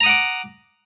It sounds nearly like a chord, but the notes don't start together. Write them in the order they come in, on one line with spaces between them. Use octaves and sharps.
A#5 D#6 F#5 D6